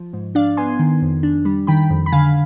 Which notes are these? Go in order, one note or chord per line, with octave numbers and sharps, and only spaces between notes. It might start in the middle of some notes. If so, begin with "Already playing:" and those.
Already playing: F3
G#2
D4 D5 F5
B3 G#5 C6
D#3
F2
D4
G3
D#3 G5 B5
F2
B5
D3 F5 G#5